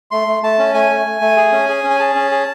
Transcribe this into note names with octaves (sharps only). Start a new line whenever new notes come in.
A3 C6
A3
A3 A5
C#4
A3 G#5
A3
A3
A3
G#4
C#4
G#4
C#4
G#5
G#4 A5
C#4
G#4